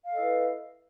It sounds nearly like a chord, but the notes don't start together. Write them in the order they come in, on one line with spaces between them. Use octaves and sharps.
F5 A4 D#5 E4 B4